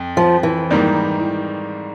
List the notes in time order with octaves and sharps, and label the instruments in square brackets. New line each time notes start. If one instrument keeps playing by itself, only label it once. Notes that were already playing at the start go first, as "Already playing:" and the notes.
Already playing: [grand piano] F2
[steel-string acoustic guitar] F3
E3
[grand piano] G#2 D#3 G3 A#3